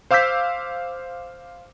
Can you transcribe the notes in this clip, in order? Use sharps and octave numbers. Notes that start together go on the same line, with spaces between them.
C5 F5 D6 E6 G6 B6